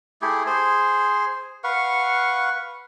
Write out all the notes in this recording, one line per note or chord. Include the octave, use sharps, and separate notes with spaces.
A3 E4 G4 G#4
G#4 C5
B4 F5 F#5 C#6